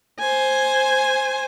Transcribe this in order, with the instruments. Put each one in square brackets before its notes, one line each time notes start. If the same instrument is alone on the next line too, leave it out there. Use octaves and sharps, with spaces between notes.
[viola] C5 G#5